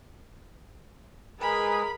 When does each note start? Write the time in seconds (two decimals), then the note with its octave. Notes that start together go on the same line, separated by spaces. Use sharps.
1.40 G#3 G#4 A#4 B4 B5